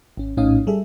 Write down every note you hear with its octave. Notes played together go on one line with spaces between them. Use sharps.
G#1 C#4
A#1 A2 C#4 D#4 F5 D#6
G3 G#4 A4 E5